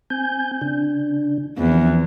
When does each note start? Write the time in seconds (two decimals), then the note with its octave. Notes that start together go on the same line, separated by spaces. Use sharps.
0.10 C4 G#5 G6
0.61 C#3 D4
1.58 E2 F3 C4